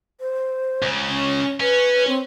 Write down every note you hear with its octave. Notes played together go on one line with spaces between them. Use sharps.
C5
C#2 C#3
C#4
C#4 B4
C4